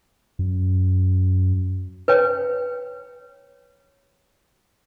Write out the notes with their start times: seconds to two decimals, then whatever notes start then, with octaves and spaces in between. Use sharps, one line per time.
0.39 F#2
2.08 B4 C#5 G5